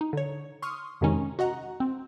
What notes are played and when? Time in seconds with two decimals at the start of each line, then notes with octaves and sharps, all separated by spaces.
0.01 D#4
0.13 D3 C#5
0.62 C6 C#6 D#6 F6
1.01 F2 C3 D#3 G#3 C#4 D#4
1.39 F#4 D#5 F#5 A#5
1.80 C4